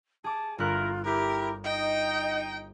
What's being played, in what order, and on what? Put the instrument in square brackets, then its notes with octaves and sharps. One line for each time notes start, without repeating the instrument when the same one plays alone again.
[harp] G#4 D6 [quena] A5
[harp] G1 F#6 [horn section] E4 A#4 [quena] F4
[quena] E4 [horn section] G4 [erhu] A#4
[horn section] D#4 [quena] D#5 [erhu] G5